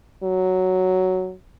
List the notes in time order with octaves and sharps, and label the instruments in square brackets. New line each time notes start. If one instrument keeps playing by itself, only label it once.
[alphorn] F#3